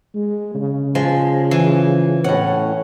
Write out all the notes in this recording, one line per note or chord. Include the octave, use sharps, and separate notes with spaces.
G#3
C#3
F3 G#3
E3
A2 C#4 F#5